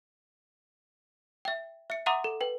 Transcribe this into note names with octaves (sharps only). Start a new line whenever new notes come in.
E5 G5
E5 C#7
E5 F#5 A#5 C6 D6 D#6
A4
B4 G5